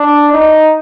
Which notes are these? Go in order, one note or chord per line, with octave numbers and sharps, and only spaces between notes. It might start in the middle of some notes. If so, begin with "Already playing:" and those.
Already playing: D4
D#4